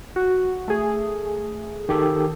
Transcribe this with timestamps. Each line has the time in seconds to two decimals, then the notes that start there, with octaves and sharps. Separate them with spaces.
0.16 F#4
0.68 A3 G#4
1.89 D#3 G4 A4